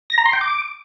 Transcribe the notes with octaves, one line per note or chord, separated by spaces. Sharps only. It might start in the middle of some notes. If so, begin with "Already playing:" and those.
A#6
A#5
C6
G5
D6